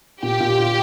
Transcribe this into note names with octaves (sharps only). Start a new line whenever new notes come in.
A#2 G4
A#2
F4